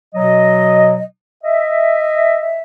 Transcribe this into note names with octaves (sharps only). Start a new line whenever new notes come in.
B2 F#3 D#5
D#5 E5